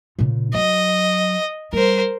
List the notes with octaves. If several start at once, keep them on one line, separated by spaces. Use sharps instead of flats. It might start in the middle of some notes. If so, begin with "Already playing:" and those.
A#2 C#3
F#3 D#5
G3 A#4 C5